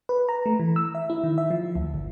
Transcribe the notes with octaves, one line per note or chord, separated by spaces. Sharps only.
B4
A#5
A3
E3
E6
E5
E4
D#3
E5
F3
D2
G1